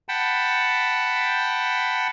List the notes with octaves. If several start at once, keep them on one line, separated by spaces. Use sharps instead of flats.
F#5 G5 A5 B5